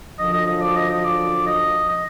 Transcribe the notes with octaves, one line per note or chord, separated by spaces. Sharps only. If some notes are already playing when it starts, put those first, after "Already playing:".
F#2 D3 F3 D#5
D#5
D#5
D5
D#5
D#5
D5
D#5
D#5